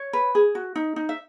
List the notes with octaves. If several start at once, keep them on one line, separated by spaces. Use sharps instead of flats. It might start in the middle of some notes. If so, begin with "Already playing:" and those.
Already playing: C#5
B4
G#4
F#4
D#4
D#4
E5